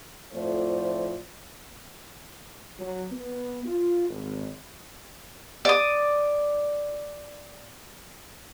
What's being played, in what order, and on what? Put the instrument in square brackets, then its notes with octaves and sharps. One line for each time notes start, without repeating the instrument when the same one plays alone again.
[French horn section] F2 A2 F3 A3 C5 D5
[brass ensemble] F#3
B3
F4
G#1
[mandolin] D5 D#6